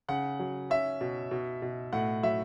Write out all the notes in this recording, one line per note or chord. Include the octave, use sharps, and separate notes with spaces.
C#3 F#5
F#3
C#4 E5
B2
B2
B2
A2 F#5
F#3 E5